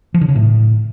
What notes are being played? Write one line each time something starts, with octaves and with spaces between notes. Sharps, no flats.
F3
D3
C#3
A2